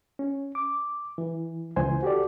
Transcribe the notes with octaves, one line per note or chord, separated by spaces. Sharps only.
C#4
D6
E3
C#2 E3 C5 G#5
F#4 G4 A4 D5